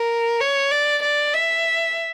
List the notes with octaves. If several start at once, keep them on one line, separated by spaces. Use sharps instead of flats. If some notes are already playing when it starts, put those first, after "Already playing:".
Already playing: A#4
C#5
D5
D5
E5